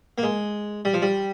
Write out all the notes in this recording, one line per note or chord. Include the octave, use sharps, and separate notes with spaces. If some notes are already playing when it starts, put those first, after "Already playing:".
A#3
G#3
G3
F3
G3